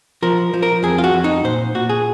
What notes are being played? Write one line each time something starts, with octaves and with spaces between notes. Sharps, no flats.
F3 A#4
F3
A#4
F2 G#4
F4
F#4
F2
D#4
A#2 C5
A#2 F#4
G#4